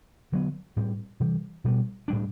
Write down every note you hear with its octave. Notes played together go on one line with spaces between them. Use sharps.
D3 F#3 B3
A2 G3 C4
C3 E3 G3
B2 G3 B3
A2 G3 D4